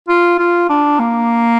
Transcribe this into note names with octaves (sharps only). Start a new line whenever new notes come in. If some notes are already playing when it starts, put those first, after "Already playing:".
F4
F4
D4
A#3